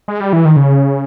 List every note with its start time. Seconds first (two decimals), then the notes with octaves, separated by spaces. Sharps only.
0.08 G#3
0.20 G3
0.33 E3
0.45 D#3
0.56 C#3